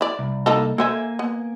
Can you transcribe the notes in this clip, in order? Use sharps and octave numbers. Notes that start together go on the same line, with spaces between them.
E4 D5
C2
A#3 D#4 A4
A#3 A4 C5 E5 G#5
B3